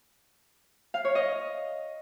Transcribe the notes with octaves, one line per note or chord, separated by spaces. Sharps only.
F5
C#5
D#5